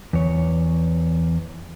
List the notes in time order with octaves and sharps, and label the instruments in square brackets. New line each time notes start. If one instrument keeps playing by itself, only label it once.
[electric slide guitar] E2 C#5